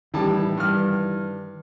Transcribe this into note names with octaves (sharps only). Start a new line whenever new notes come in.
A2 D#3 E3 G3 A5
G2 F6